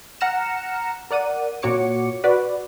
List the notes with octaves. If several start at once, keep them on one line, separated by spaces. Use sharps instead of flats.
F#5 A#5 F6 A#6 C#7 E7
A#4 D5 F#5 D#7
A#2 F#4 C#5 D6 C#7
F#4 B4 D5